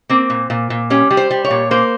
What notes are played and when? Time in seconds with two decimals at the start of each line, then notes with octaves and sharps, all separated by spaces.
0.09 A#3 C4
0.30 A#2
0.50 A#2
0.70 A#2
0.90 G3 C#4
1.11 G3
1.17 C5
1.31 G3
1.45 C#5
1.51 A#2
1.71 A#3 C5